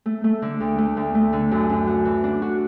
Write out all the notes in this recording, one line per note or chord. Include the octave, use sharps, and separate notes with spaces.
A3
A3
D3
D2
A3
D2
A3
D3
F#2
F#2
F#4
E3
D4
F#4